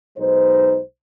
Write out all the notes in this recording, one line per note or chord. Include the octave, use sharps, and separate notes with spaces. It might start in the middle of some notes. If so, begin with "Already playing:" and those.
B1 G#3 D#4 B4 C5